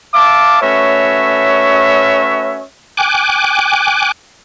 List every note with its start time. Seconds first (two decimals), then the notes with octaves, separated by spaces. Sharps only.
0.14 E5 F5 A5 D6
0.62 A3 C#4 F#4 B4 C#5 E5
2.97 G5 G#5 D6 F#6